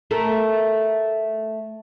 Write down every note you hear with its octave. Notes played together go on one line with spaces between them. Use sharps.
A3 A#4